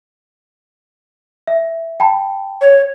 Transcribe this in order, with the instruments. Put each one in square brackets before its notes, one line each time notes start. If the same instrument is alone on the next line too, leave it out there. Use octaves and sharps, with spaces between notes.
[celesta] E5
G5 A5 B5
[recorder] C#5